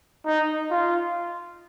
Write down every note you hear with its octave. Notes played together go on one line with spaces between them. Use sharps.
D#4
F4